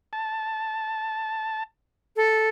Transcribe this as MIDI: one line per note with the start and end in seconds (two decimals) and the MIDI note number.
0.13 1.63 81
2.16 2.49 69